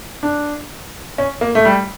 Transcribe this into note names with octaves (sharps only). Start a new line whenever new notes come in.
D4
C#4
A#3
A3
G3